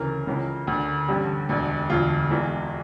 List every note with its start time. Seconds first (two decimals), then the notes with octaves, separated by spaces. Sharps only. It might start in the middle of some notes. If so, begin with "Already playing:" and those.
Already playing: D2 C#3 E3 A#4
0.27 C#2 C#3 E3
0.67 D2 D3
1.08 A1 G2 D3 G4
1.49 E1 D2 D3
1.90 E1 D2 D3 F4
2.30 E1 E2 E3